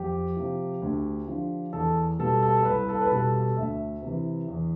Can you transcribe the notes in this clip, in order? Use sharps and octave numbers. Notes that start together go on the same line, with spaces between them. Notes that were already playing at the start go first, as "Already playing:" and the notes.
Already playing: F2 G4
C3 F3
D2
D3 F3
E2 A4
B2 G3 A4
A4
A4
C2 B4
A4
B4
B2 G3 A4
A4
D2 E5
C3 E3
E2